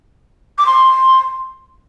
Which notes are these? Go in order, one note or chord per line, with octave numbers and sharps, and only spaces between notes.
D6
C6